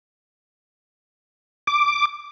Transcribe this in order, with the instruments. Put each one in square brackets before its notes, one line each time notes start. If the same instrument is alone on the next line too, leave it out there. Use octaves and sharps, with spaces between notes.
[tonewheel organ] D6